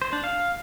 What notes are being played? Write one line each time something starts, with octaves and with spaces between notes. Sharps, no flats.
C5
D4
F5